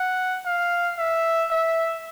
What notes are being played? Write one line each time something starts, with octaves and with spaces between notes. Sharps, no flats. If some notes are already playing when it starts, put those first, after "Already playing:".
Already playing: F#5
F5
E5
E5